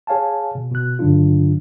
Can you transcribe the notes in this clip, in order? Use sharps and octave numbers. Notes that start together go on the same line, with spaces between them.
G#4 C#5 F5 G#5 A5
B2
B2 F#6
G2 D3 F#3 D4 F4